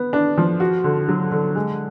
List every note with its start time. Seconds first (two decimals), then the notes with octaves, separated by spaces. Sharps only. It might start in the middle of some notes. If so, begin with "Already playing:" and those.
Already playing: B3
0.13 D4
0.37 F3
0.60 F#4
0.84 D3
1.08 F#3
1.32 D3
1.55 G#3